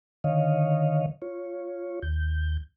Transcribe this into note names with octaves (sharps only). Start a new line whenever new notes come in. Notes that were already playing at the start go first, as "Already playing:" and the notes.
D3 D#3 C#5 D#5 F5
F4 C#5
D#2 G6